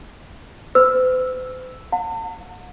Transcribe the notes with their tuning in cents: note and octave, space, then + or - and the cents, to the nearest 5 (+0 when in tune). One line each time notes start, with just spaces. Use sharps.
C5 -45 E6 +0
F#5 -35 A5 +45